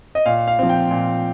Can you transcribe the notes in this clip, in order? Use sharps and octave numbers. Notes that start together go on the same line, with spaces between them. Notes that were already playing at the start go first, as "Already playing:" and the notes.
D#5
A#2 F5
F5
F3 C4
G5
A#2